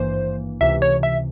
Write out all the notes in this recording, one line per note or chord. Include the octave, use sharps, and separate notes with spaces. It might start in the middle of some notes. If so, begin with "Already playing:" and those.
Already playing: G#1 G2 E3 A#3 C5
C#2 C3 E3 E5
C#5
E5